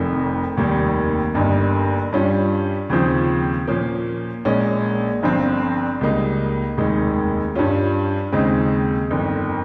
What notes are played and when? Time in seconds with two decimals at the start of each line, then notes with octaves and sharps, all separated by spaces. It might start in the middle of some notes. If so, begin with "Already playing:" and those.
Already playing: F1 F2 D#3
0.57 F1 D#2 D#3 G3 A#3
1.34 G1 G2 G3 A#3 D#4
2.12 G2 G3 C#4 F4
2.89 D#2 C#3 F3 C4 F4
3.67 A#2 F3 A#3 C#4
4.45 A#1 A#2 G#3 C#4
5.23 G1 G2 F3 C4 F4
6.01 C#2 C#3 G3 A#3 D#4
6.77 F1 D#2 D#3 G#3
7.55 G2 G3 C#4 F4
8.32 D#2 C#3 G#3 C4 D#4
9.10 G1 F2 D#3